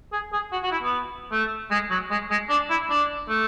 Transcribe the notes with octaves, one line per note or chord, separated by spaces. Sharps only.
G#4
G#4
F#4
F#4
E4
B3
A3
G#3
F#3
G#3
G#3
D4
E4
D4
A3